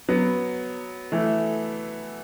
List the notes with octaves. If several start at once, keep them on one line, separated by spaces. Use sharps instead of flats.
F#3 B3
E3 A3